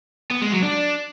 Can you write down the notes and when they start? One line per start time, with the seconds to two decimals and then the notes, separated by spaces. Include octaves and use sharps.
0.31 B3
0.41 G#3
0.52 F#3
0.62 D4